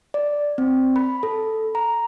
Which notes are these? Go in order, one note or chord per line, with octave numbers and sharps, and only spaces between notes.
D5
C4
B5
A4
A#5